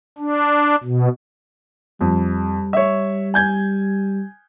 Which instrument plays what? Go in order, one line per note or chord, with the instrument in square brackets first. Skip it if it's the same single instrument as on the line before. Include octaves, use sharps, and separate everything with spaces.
[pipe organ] D4
B2
[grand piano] F2 [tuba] G3
[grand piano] C#5 E5
G#5 G6 G#6